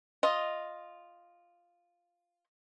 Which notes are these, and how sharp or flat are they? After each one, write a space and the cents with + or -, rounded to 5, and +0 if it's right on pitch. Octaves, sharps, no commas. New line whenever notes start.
F4 +0 D#5 +0